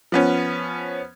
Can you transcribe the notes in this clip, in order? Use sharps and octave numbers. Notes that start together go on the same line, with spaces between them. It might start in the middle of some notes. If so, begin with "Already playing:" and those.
F3 B3 C#4